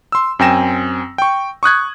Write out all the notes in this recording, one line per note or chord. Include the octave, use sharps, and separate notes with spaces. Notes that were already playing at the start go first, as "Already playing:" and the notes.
C6 E6
F#2 C4 G5 G#5 A#6 E7
G5 C#6
C#6 D#6 F#6 G#6